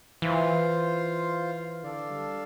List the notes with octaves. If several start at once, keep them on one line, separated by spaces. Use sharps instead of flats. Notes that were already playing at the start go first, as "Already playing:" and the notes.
E3 F4 C5 F5
D3 D4 A4 D5 F5
G3